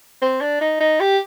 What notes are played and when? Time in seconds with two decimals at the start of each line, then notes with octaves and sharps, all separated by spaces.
0.22 C4
0.41 D4
0.61 D#4
0.80 D#4
1.00 G4